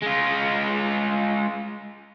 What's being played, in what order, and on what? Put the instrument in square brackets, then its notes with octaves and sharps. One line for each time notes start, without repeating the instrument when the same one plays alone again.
[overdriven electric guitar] G#3 F4